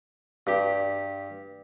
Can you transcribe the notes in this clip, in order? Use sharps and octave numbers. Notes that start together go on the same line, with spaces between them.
G2 G4